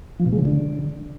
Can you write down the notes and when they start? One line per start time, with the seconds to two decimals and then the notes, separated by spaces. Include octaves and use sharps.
0.20 F3
0.26 B2
0.32 G#3
0.39 C#3
0.45 D3